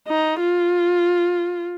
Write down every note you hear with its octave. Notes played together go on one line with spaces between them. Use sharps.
D#4
F4